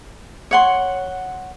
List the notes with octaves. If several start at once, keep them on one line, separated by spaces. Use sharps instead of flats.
C#5 F#5 C6